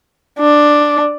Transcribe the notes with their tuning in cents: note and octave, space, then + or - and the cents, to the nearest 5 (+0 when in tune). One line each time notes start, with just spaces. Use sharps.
D4 +5